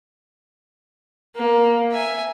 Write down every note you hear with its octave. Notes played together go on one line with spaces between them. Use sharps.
A#3
E5 G#5